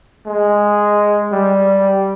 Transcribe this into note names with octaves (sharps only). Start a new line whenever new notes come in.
G#3
G3